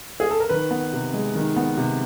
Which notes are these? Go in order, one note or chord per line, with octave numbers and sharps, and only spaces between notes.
G#4
A4
A#4
D#3 B4
B3
C3
G#3
D#3
B3
C3